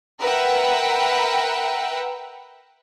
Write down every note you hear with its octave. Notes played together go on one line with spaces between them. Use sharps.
A#4 B4 E5 F#5 G5